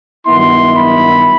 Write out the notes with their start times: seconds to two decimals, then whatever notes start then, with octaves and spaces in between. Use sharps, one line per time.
0.25 G2 D#3 F#3 B3 E4 C6
0.75 B5